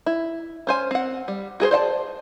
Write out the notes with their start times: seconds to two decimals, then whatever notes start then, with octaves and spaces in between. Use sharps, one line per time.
0.06 E4
0.67 C#4 C5 G#5
0.91 C4 F#5
1.28 G3
1.60 F#4 G#4 A4 C5
1.71 C5 D5 F#5 A5